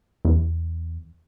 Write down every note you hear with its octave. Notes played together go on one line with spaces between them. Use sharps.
E2